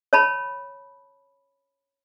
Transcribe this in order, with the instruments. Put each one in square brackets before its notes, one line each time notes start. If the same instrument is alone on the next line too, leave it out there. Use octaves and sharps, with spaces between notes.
[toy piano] C#5 A5 B5